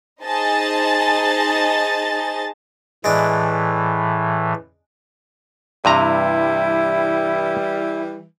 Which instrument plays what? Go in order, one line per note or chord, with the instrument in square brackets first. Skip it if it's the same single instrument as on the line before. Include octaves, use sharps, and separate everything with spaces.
[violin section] D#4 G#4 C5 D#5 A5 A6
[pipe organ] A2 E3 [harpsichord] G#3 D4
[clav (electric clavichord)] G2 C3 A#5 [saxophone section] E3 G3 [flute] E4